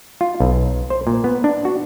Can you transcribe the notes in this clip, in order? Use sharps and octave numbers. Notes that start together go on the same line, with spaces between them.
F4
B1
C5
A#2
B3
D4
F#4